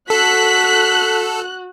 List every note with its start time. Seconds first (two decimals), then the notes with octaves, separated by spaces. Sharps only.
0.10 F#4 A4 F#6 B6